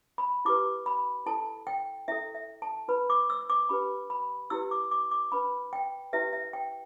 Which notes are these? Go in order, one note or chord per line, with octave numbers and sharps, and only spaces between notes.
B5
E4 G4 B4 D6
B5
E4 A4 A5
G5
E4 A4 E5
E5
A5
E4 B4 B5
D6
E6
D6
D4 G4 B4 B5
B5
E4 G4 B4 E6
D6
D6
D6
D4 B4 B5
G5
E4 G4 B4 E5
E5
G5